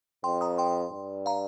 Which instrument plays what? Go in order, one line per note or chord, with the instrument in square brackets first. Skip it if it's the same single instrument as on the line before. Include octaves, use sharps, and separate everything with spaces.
[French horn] F2 [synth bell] G5 C6
[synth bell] A#5 D#6
G5 C6
[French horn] G2
[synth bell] F5 A#5